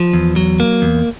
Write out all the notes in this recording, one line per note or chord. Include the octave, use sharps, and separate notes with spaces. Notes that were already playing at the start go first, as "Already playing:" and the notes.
Already playing: F3
E2
F#3
A#3
E2